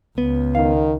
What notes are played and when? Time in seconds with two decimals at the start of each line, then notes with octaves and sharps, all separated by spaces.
0.18 C#2 B3
0.55 D#3 F5